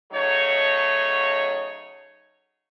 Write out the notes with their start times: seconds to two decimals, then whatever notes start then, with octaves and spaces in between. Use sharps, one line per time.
0.12 C#3 F#3 A3 D#4 C#5